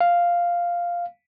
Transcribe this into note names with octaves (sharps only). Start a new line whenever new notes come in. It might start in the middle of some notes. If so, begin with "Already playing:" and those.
F5